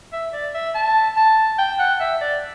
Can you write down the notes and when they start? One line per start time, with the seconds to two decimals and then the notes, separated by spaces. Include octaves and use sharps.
0.12 E5
0.33 D5
0.54 E5
0.75 A5
1.16 A5
1.58 G5
1.79 F#5
2.00 E5
2.21 D5